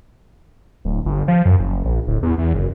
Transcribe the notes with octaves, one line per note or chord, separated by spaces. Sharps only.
D1
G1
F3
F#2
F#1
A#1
D1
E2
E2
F#1